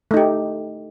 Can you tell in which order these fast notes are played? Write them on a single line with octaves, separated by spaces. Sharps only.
A3 D#4 G4